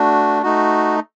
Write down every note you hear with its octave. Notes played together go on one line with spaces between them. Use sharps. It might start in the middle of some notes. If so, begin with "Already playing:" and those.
Already playing: A3 D4 F#4
A3 D#4 F#4